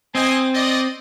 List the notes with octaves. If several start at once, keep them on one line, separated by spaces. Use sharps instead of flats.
C4 D#5 G#5
D5 D#5